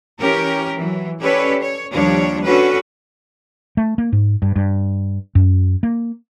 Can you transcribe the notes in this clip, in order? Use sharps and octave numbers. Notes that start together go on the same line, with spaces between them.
E3 C#4 G4 A#4
E3 F#3
C#4 G4 A4 B4 C#5 D5
C#5
D#2 F3 G3 D4 C#5
C#4 D4 F#4 A4 B4
A3
A#3
G#2
G2
G2
F#2
A#3